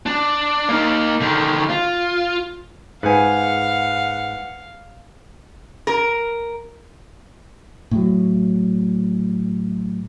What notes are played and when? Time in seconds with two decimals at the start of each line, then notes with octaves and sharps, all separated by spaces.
0.06 D4
0.69 A#3 D#4
1.21 D3 D#3
1.70 F4
3.03 G#2 B4 F5 F#5 G#5
5.87 A#4
7.91 A2 F#3